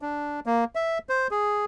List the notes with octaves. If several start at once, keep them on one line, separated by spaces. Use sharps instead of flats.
D4
A#3
E5
C5
G#4